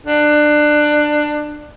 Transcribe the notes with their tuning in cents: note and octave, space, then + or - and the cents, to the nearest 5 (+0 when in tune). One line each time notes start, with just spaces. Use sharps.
D4 +20